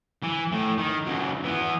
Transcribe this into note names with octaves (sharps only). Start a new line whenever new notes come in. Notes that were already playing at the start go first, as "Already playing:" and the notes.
E3
A2
D#3
C#2 F#3
E3 B3